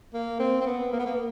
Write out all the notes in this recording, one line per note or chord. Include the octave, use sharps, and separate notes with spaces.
A#3
C4
C4
B3
A#3
B3
A#3